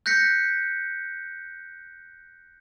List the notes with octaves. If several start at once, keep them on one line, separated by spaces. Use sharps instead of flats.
F#6 G6 A#6 B6 C#7